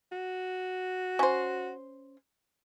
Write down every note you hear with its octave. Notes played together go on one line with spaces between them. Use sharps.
F#4
C#4 C5